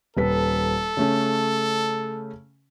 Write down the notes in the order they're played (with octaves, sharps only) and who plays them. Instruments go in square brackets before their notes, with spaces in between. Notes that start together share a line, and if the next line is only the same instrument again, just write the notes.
[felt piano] D#1 B4 B6 [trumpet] A4
[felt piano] C#3 A3 C#4